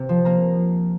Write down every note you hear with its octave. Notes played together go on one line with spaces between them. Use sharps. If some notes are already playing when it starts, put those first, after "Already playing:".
Already playing: C3 A#3
F3
A#3 A#5